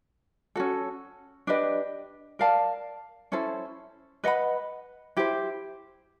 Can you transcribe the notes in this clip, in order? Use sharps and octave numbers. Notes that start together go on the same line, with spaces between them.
C#4 F#4 A4
D4 G4 B4 D#5
A#4 D5 F5 A5
C#4 E4 A4 C5
B4 D#5 F#5 B5
E4 G4 C5